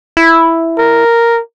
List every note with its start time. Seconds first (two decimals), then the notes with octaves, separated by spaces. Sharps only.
0.17 E4
0.78 A#4